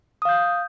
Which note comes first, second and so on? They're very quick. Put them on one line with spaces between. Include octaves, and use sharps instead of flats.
D#6 F5 G6